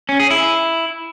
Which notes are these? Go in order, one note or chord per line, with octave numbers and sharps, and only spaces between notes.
C#4
G#4
E4